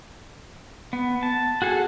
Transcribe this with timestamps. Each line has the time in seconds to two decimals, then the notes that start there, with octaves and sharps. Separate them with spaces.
0.93 B3
1.23 A5
1.62 F#4 G#4 A4